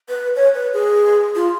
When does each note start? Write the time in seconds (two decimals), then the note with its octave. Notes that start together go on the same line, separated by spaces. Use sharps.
0.09 B4
0.36 C#5
0.54 B4
0.73 G#4
1.35 F4